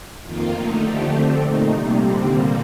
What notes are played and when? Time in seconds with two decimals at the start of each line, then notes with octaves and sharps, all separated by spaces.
0.24 F2 D#3 A#3 F4
0.54 D3 A3 D#4
0.82 D3 F3 A3 D4 G4
1.12 D3 A3 C4
1.41 A#2 A3 D#4
1.70 C3 D#3 G3 A#3
1.98 D3 G3 C4
2.28 A#2 G3 A#3